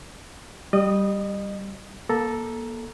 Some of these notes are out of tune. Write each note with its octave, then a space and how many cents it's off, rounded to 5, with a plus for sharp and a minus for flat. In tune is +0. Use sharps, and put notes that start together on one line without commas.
G3 +0 D#5 -35 D#6 +0
A#3 +30 A4 +0 A#5 +15